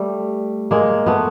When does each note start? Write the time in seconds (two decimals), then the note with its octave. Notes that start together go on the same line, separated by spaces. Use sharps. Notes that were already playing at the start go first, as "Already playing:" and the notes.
Already playing: G3 A3
0.71 G#3 A#3
1.06 A3 B3